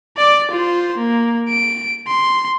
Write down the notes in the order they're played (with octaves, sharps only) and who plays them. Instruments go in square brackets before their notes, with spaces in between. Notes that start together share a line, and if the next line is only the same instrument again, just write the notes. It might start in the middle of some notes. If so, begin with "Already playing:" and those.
[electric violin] D5 D6
F4 C5
A#3
D7
C6